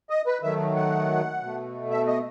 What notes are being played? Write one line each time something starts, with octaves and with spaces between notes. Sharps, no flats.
D#5
B4
D#3 F#3 A3 E5
F#5
B2 A3
E5
D#5